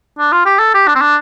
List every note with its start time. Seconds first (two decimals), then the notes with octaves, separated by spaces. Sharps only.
0.19 D4
0.32 F4
0.46 G4
0.59 A4
0.74 G4
0.87 D4
0.95 C4
1.01 D4